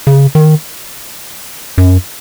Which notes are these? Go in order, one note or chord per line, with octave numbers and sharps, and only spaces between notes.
C#3
D#3
F#2